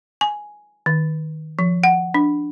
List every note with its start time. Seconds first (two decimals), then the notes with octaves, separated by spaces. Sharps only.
0.21 G#5
0.86 D#3
1.59 F3
1.84 F#5
2.14 D4